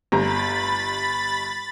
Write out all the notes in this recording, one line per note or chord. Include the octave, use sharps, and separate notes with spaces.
G1 G3 A#5 B5 A6